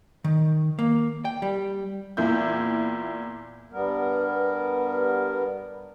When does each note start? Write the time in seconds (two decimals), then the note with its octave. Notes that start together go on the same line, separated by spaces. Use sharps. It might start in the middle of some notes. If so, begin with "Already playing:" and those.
0.24 D#3
0.79 A#3
1.25 G5
1.42 G3
2.17 E2 A#2 E4 G6
3.73 G2 G3 B3 A#4